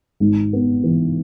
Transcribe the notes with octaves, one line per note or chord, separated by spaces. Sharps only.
G#1
B3
E3